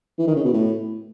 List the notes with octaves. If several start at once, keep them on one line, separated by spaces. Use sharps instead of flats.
E3
D#3
C#3
B2
A2